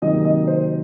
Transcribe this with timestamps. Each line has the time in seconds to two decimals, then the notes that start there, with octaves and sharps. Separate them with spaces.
0.02 C3 D#3 F#3 A#3 D#4 D#5
0.25 D#5
0.47 C5